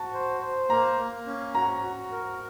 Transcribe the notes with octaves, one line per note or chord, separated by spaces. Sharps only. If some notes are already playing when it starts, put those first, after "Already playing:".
Already playing: F#4 A5
C5
C5
A#3 A#5
A#3
C#4
F#4 A#5
F#4
A#4